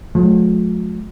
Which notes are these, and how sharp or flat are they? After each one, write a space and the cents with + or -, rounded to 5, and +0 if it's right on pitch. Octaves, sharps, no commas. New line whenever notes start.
F3 +45 A3 -45